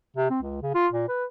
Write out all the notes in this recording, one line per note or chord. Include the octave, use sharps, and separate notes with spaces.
C3
C4
C#2
C#3
F4
A#2
B4